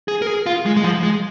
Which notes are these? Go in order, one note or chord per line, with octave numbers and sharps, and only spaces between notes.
G#4
A#4
G#4
F4
G#3
G#3
F3
G#3